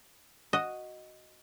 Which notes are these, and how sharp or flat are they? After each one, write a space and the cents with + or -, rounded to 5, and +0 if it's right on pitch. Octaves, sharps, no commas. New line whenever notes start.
F#4 +0 D#5 +0